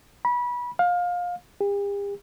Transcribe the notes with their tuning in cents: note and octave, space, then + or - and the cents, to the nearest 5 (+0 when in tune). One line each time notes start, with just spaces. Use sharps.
B5 -25
F5 +25
G4 +45